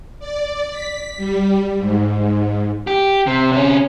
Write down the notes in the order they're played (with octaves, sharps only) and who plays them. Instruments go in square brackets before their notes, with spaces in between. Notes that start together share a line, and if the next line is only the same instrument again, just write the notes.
[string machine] D5
B6
G3
G#2
[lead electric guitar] G4
C3
C3 C#4